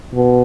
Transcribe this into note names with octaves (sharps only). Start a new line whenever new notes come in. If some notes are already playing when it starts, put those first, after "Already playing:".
B2